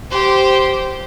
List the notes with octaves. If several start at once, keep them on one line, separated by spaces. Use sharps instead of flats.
G4 C5